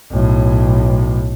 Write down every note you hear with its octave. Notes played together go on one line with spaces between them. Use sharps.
B1 A2